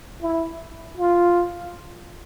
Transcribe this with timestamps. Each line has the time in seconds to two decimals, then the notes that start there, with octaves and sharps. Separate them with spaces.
0.22 E4
0.97 F4